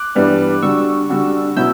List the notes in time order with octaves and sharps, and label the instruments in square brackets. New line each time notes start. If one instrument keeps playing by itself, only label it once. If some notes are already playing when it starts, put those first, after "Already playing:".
Already playing: [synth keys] D6 F#6
[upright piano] G2 E3 G3 B3 D4
[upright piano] D3 G3 D4 F#4 [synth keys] C#6 E6
[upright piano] D3 G3 D4 F#4
[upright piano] B2 F#3 C#4 E4 [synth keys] E6 G6